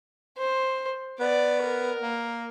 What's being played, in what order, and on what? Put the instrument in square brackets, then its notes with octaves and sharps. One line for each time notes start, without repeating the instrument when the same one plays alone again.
[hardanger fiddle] C5
[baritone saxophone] B3 [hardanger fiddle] D5
[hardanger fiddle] A#4
[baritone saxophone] A#3